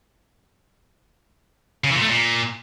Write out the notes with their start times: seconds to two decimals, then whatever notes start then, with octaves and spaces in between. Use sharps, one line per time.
1.84 C#3
1.90 E3
1.96 A#2
2.02 A3
2.08 A#2